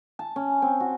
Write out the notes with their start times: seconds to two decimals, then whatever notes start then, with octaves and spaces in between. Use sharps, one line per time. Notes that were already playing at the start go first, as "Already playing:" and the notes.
0.19 A5
0.36 C#4
0.62 C4
0.80 F#4